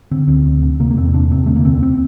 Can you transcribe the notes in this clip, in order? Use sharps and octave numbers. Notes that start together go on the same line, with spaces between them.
D3 C4
D2 C4
D2
D3
C3 A#3
A#3
E2 C4
E2 D4
C3 C4
D3 A3
A#3
D2 C4
C4